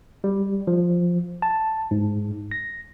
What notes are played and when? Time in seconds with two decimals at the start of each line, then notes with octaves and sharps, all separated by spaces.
0.24 G3
0.67 F3
1.42 A5
1.91 G#2
2.51 A#6